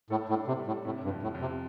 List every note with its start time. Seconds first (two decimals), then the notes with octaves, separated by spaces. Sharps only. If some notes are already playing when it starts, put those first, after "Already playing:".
0.10 A2 A4
0.29 A2
0.36 D4
0.48 C3
0.60 G3
0.67 A2
0.85 A2 C3
1.04 G2
1.10 F2
1.23 A2
1.34 F2
1.41 C3